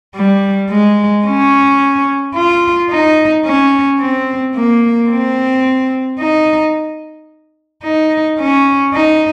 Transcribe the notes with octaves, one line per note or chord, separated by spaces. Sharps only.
G3
G#3
C#4
F4
D#4
C#4
C4
A#3
C4
D#4
D#4
C#4
D#4